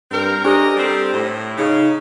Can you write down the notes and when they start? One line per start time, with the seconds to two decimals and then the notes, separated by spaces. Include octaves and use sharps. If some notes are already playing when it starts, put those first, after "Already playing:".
0.11 G2 C4 A#4
0.44 D4 G4 A4 A#4 C5 D5 D#5
0.77 G3 C4
1.13 A2
1.57 C#3 D#4